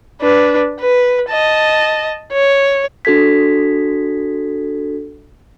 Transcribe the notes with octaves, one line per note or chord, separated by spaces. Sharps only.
D4 B4
B4
D#5 A5
C#5
D4 F#4 A4 G#6 B6